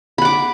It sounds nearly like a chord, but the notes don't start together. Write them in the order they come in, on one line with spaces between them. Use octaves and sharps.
B5 F#5 D6